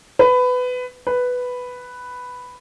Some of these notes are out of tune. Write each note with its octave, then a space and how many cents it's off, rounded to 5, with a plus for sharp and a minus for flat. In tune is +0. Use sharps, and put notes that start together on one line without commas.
B4 +20
B4 +5